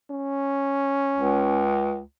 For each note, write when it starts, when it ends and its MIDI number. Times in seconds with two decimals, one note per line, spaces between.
0.10 1.67 61
1.17 2.01 37